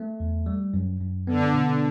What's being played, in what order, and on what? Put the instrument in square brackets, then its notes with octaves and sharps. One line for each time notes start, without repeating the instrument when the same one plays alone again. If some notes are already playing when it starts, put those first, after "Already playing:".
Already playing: [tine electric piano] A3
E2
G3
F#2
F#2
[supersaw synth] D3 [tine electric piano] B3
[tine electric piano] B2